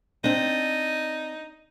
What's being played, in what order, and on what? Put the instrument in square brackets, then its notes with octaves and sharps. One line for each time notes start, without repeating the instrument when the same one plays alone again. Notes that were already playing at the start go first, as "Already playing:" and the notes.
[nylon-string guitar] C4 D4 [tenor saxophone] D#4